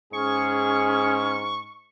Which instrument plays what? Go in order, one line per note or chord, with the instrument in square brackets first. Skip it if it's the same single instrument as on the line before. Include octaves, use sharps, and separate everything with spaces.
[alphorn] G#2 [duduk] C#4 [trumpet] G#4 [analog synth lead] C#6